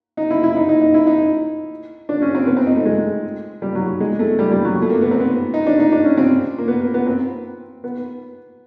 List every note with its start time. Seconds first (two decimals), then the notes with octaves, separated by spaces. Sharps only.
0.17 D#4
0.30 E4
0.43 E4
0.56 D#4
0.69 D#4
0.81 D#4
0.94 E4
1.07 D#4
2.09 D4
2.22 C#4
2.35 C4
2.47 B3
2.57 C4
2.67 D#4
2.76 A3
2.86 G#3
3.62 G3
3.75 F#3
4.00 G#3
4.19 A3
4.39 G3
4.52 G3
4.65 F#3
4.82 A3
4.90 A#3
5.02 B3
5.11 C4
5.20 B3
5.54 D#4
5.67 D4
5.80 D#4
5.92 D4
6.05 C#4
6.17 C4
6.58 A#3
6.68 B3
6.81 A#3
6.94 B3
7.07 C4
7.84 B3